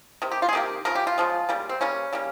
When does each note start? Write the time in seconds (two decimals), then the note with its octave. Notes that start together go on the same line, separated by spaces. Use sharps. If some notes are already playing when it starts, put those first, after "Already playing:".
0.22 C3 D#3
0.32 G4
0.42 F4
0.49 G#4
0.53 C3 D#3 A#3 G4
0.85 C#3 F3 A#4
0.95 G4
1.07 F4
1.18 C#3 F3 G#3
1.49 C#3 G3 A#3
1.69 C4
1.81 C#3 G3 A#3 C#4
2.13 C#3 G3 A#3